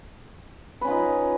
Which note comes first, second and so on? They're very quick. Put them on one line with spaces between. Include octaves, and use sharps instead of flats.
B4 C#4 F4 D#4